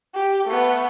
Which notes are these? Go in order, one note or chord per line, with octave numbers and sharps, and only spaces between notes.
G4
A3 B3